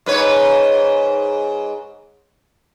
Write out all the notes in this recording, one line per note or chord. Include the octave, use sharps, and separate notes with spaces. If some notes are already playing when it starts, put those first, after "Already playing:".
G#2 B4 C#5